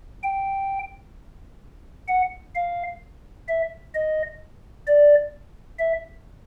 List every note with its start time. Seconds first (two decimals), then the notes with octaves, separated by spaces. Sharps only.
0.23 G5
2.08 F#5
2.55 F5
3.48 E5
3.95 D#5
4.87 D5
5.79 E5